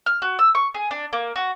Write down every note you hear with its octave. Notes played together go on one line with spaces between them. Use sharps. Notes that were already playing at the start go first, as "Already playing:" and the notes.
F6
F#4
E6
C#6
G#4
D4
A#3
F#4